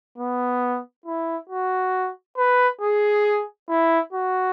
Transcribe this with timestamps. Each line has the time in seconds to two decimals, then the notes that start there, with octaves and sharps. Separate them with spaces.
0.18 B3
1.06 E4
1.49 F#4
2.37 B4
2.81 G#4
3.69 E4
4.13 F#4